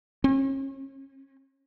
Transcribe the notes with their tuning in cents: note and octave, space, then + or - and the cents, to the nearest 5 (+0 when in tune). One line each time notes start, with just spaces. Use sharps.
C#4 -35